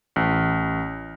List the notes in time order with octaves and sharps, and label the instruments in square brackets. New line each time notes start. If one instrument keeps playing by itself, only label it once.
[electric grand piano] A1